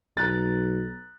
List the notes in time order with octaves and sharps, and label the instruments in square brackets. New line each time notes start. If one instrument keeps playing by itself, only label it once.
[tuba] B1 [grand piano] A#5 F#6 A6